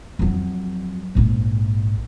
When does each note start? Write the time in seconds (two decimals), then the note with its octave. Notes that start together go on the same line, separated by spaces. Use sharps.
0.19 F2 F#3
1.15 A#1 G#2